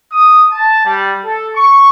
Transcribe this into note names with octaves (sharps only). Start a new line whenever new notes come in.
D#6
A5
G3
A4
C#6